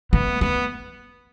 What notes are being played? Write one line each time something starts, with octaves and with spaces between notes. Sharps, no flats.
A3 B3
A3 B3